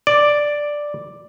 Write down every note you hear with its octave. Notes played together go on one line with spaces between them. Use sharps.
D5